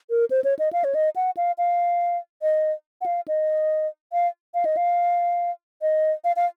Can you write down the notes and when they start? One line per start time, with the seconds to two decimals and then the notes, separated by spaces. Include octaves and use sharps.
0.10 A#4
0.31 C5
0.44 C#5
0.59 D#5
0.73 F5
0.84 C#5
0.95 D#5
1.16 F#5
1.37 F5
1.58 F5
2.42 D#5
3.01 F#5
3.06 F5
3.28 D#5
4.13 F5
4.54 F5
4.65 D#5
4.77 F5
5.82 D#5
6.24 F5
6.36 F5